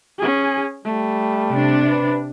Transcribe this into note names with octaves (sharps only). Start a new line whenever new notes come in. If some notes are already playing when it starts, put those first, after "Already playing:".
C#4 G#4
G3 A3
C3 D4
B4